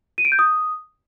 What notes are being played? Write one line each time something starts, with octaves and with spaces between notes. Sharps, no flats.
D#7
D7
G6
D#6